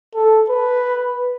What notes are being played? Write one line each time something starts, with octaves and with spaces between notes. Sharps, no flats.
A4
B4